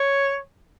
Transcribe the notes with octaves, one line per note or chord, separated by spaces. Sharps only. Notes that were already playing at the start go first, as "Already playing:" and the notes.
Already playing: C#5